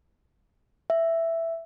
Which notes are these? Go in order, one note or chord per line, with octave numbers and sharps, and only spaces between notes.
E5